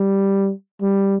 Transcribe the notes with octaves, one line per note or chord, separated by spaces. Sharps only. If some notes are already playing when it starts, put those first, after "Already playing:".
Already playing: G3
G3